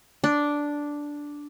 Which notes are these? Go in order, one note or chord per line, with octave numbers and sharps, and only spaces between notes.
D4